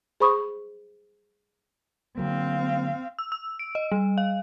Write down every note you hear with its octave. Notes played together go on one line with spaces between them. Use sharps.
G#4 C5 B5 C#6 D#6
D3 F#3 A#3 C4 F5
E6
E6
D7
D#5
G3
F5